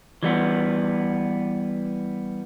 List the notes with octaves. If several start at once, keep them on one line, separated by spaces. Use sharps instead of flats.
E3 G3 B3